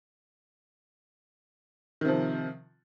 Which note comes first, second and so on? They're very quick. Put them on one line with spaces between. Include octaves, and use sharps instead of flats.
D#3 C3 F3